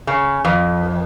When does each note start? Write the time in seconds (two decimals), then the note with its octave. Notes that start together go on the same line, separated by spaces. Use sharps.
0.07 C#3
0.45 F2